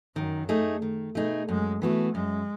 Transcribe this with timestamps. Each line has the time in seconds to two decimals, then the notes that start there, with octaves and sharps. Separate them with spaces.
0.16 F#2 D#3
0.49 A3 D#4 G#4
0.82 D#3
1.15 B2 A3 D#4 G#4
1.49 F#2 G#3
1.82 E3 A3 B3 F#4
2.15 F#2 G#3